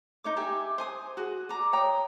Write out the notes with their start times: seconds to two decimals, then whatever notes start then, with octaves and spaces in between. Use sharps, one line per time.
0.24 D#4 C#5 D6
0.37 G4 E5 G#5
0.78 C5 G#5 D#6
1.17 F#4 G#4
1.49 D5 A#5
1.73 C#5 G5 A#5 D#6